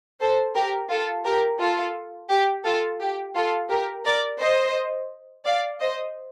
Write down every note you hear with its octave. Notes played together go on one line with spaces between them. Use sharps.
A4 C5
G4 A#4
F4 A4
G4 A#4
F4 A4
G4
F4 A4
G4
F4 A4
G4 A#4
A#4 D5
C5 D#5
D5 F5
C5 D#5